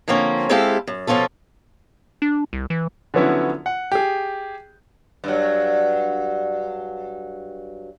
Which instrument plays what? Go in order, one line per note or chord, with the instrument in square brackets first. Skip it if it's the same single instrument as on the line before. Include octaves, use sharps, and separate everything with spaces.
[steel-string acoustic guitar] D3 F3 A#3 C4 C#4
G#3 C4 E4 G4 A4 F5
F#2
B2 F3 C#4 F4 A4
[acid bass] D4
C2
E3
[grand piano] D3 F3 F#3 B3 C#4 E4
F#5
G4 G#4
[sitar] G2 F#3